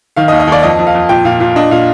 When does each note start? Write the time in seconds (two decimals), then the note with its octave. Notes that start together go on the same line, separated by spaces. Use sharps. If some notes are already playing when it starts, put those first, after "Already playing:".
0.16 D#3 F5
0.28 D#5
0.32 D#2
0.40 D#5
0.47 D#2 D5
0.63 F2 D#5
0.79 F2
0.87 F5
0.95 F2
1.09 A#2 G5
1.25 A#2 F5
1.40 A#2 F5
1.56 D4 D#5
1.71 A#2 F5